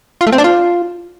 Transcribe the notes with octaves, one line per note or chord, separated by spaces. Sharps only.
F4
A3
C4
D4
F4